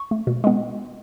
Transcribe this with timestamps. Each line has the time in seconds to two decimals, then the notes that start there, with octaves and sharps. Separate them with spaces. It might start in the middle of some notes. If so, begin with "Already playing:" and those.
Already playing: C#6
0.11 A3
0.27 B2
0.44 G#3 B3